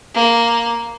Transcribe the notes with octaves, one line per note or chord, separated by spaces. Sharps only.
A#3